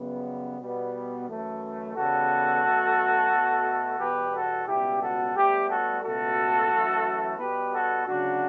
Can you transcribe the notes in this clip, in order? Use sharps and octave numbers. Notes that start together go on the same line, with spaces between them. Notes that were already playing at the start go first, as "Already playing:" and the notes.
Already playing: F#2 C#3 G3 B3
B2 G3 B3
F#2 E3 A3
E2 C#3 G3 B3 F#4 A4
B2 F#3 A3
B2 A3
E2 B2 G3 G4 B4
F#4 A4
C#2 B2 G3 B3 E4 G4
F#4 A4
A2 G3 B3 E4 G4
F#4 A4
C#2 B2 A3 F#4 A4
F#2 E3 A3
B2 G3 B3 G4 B4
F#4 A4
D2 C#3 F#3 D4 F#4